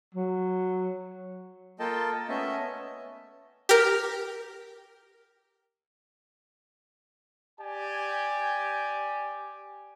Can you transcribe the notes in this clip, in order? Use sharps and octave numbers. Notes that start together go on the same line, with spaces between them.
F#3
A#3 F4 A4 D#5 G5 A5
A3 B3 C#4 D#5 E5
G4 A#4
G4 D5 G#5